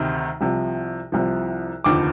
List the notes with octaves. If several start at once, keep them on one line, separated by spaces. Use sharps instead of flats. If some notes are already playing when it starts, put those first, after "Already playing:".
Already playing: D2 C3 D#3
C2 C3 F3
C2 C3 F3
F1 D#2 D3 F3 D6